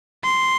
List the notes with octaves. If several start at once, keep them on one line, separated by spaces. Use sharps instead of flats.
C6